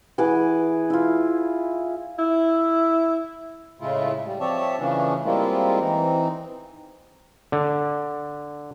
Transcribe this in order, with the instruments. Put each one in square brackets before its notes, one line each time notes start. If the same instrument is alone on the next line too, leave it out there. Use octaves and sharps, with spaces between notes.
[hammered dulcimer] E3 G#4 F#5 D6
E4 F4
[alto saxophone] E4
[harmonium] A2 C#3 G#3 A3 E4 F4
G3
F3 C4 C#5 D5 E5 A5
C#3 E3 F3 A3 C#4 D4
G3 G#3 A#3 C4 E4 F4
E3 C4 D#4
[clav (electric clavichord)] D3